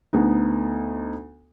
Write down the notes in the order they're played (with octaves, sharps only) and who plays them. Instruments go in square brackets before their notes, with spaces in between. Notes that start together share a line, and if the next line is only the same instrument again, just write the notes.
[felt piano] D2 B3 D#4